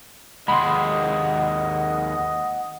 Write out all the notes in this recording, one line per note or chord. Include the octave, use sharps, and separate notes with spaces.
D#2 G#3 D#5 F#5 B5 C6